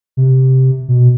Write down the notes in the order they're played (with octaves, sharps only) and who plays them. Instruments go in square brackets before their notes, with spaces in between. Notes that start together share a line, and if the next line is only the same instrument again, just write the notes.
[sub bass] C3
B2